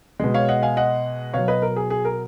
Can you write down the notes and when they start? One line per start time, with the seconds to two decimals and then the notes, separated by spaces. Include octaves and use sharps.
0.20 B2 G#3
0.34 C#5 F5
0.48 D#5 F#5
0.63 F5 G#5
0.77 D#5 F#5
1.34 B2 F#3 C#5 F5
1.48 B4 D#5
1.62 A#4
1.76 G#4
1.90 G#4
2.05 A#4